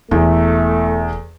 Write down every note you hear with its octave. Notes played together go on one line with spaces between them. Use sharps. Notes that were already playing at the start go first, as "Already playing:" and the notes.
E1 E2 A3